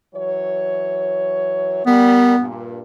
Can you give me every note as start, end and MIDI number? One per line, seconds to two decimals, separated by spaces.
0.14 1.83 52
0.14 1.83 54
0.14 1.83 73
1.87 2.36 55
1.87 2.46 59
1.87 2.36 70
2.38 2.82 43
2.38 2.82 46